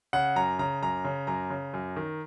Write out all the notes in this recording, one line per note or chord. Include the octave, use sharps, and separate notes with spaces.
C#3 F#5
F#2 A#5
C#3 A#5
F#2 A#5
C#3
F#2 A#5
C#3
F#2
D#3